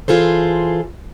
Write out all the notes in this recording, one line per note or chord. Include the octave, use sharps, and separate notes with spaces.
E3 F4 G#4 A4 C5